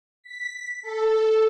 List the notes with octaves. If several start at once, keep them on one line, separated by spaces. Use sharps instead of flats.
B6
A4